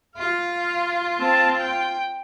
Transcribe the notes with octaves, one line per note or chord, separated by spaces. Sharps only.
F4 F5
C4 A5
G5